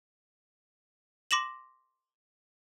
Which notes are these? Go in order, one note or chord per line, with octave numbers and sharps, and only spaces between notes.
C6 D6 A#6 E7 F#7